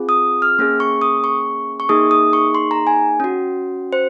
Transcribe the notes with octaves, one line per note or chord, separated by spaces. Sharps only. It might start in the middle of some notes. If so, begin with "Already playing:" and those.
Already playing: C4 F4 G#4
D#6
F6
A#3 C#4 G#4
C#6
D#6
C#6
C#6
A#3 D#4 G#4 D#6
D#6
C#6
C6
A#5
G#5
C#4 F#4
C5